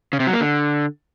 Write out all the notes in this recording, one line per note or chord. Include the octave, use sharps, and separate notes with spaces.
C#3
C3
F#3
A#3
D3